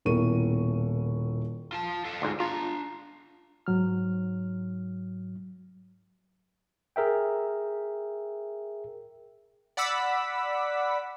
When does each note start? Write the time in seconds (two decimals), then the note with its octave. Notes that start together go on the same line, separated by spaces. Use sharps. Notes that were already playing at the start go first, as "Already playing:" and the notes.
0.05 D#1 B2 E4 A#4 C#6 D#7
1.73 F4 A5
2.05 F4 A4
2.22 D2 G#2
2.40 D4 F4 A#5
3.67 G#2 F#3 F6
6.96 G#4 A#4 E5 G5
9.77 D5 F#5 B5 D6 E6 B6